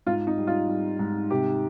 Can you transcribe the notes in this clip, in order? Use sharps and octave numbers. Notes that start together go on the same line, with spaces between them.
G#2 F4
D#4
G3
F4
G3
G#2
C3 G4